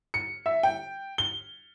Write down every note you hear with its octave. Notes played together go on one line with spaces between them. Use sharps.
C#7
E5
G5
G7